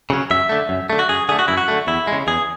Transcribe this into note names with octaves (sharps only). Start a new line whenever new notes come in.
C#3 F#3 C#4
F#2 E5
D3 A3
F#2
D3 A3
F#4
F#2 G#4
D3 A3 G#4
F#4
F#2 E4
F#4
D3 A3
E2 E4
C#3 G#3
E2 G#4